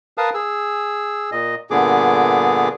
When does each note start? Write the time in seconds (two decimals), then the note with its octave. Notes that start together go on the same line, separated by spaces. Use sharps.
0.18 A#4 B4 F5 A5 D#6
0.34 G#4 E6
1.32 A#2 D#5
1.71 G2 A#2 D3 B3 G#4 D6